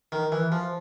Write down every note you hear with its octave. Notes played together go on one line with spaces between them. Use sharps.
D#3
E3
F3